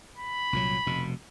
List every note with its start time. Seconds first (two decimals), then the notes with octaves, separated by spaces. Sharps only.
0.17 B5
0.53 C2 A#2 F#3
0.86 F1 B2